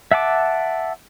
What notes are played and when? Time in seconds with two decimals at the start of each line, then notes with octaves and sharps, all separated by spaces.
0.12 E5 F#5 A5 D6